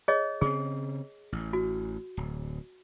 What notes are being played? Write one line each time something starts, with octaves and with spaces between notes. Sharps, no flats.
G#4 C#5 D#5
C#3 C4 G#4
A1
F#4
D1